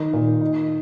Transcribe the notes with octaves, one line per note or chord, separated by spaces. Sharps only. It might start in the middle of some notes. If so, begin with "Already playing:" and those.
Already playing: D#3 D#4
A#2
D#4